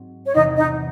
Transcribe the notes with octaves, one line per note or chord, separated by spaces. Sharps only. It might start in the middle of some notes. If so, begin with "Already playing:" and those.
Already playing: G#2 F#3 C4
C#5
E2 C3 E3 D#4 D#5
D#4 D#5